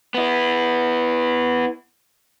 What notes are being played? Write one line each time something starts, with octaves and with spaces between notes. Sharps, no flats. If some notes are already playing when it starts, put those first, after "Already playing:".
B3 E4